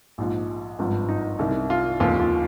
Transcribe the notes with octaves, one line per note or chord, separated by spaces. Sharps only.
A#1 G#2 F3
G#1 G2 F3
D#4
C2 C3 D#3
F4
F1 D#2 C#3 F3 F4
F4